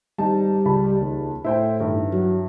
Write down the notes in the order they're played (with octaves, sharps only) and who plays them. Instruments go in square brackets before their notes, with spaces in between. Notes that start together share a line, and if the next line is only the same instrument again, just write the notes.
[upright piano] G#1 D#4 A5 [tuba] G3
[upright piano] C#2 A5 B5
[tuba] D#2
[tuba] A2 [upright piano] E4 C5 G5
[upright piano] G2 D#3 E4
[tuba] F#3